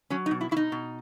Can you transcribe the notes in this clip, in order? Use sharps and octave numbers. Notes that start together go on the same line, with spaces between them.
F#3 C#4
D#4
B2
E4
B2 E4
D#4
B2